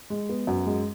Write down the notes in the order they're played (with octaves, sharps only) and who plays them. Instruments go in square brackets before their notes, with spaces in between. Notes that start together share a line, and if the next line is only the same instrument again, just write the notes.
[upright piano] G#3
B3
F#2
G#3